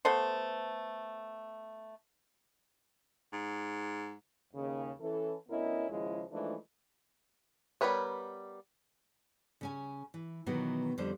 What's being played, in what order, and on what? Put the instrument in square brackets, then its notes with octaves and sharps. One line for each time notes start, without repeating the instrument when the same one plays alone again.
[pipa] A3 B3 A4 C5
[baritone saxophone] G#2
[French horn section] D#2 C#3
E3 C#4 A4
D2 B3 C#4 E4 A#4 D#5
D#2 C#3 F3 G#3 E4 G#4
E3 F3 G#3 A3 D4 D#4
[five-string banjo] G3 B3 A#4 B4 C#5
[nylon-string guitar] C#3 C#4 G#5
E3
B2 D#3 E3 F#3 B3
F2 D3 G3 D4 C5